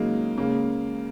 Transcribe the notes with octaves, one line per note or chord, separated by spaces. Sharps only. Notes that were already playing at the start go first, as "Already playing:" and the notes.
Already playing: C#3 F#3 G#3 A#3 D#4
C#3 G#3 A#3